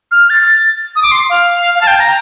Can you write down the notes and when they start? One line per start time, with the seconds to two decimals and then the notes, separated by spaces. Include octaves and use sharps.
0.11 F6
0.30 A6
0.96 D#6
1.02 D6
1.11 C6
1.29 F5
1.75 F5
1.81 A5
1.87 G5
2.00 A#5